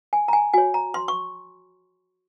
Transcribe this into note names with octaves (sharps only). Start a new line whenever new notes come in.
G#5
A#5
G#5
F#4 C#5 G#5
A#5
C6
C#6